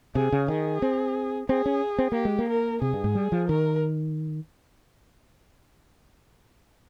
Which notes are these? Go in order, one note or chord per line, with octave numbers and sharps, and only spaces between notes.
C3 G#4
C#3
D#3 G#4
C4
C4 G#4
C#4
C4
A#3 G4
G#3
A#3
A#4
C3 G#4
G2
G#2
G3
F3
D#3 A#4